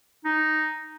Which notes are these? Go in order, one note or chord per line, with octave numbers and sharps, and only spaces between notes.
D#4